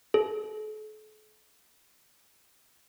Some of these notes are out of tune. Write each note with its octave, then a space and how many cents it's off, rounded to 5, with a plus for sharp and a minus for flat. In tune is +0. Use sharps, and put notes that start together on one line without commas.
A4 -40